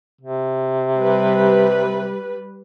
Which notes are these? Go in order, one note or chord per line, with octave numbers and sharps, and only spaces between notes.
C3
G3 B4